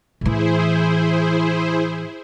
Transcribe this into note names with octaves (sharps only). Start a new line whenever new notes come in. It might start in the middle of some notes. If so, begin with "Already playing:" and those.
A2 E3 E4 G#4 C5